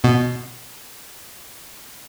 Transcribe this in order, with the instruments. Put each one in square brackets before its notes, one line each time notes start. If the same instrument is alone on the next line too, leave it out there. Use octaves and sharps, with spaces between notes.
[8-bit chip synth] B2